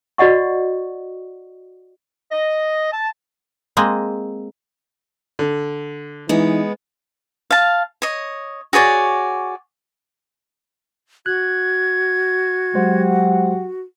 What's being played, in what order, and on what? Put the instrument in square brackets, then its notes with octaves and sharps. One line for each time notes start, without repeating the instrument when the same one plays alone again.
[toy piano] F#4 D5 D#5 F#5 C#6
[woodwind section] D#5
A5
[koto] G#3 A#3 C4
[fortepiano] D3
[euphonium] E3 [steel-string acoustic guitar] G#3 B3 [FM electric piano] D#4 E4
[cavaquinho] F5 A5
C#5 D#5
F#4 G#4 C#5 D5
[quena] F#4 [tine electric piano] F#6 [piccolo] G#6
[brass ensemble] F#3 G4 F#5 [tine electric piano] G#3 C5